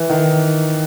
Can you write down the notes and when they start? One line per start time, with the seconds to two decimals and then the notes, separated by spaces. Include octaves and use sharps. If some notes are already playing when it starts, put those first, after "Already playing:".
Already playing: E3
0.10 D#3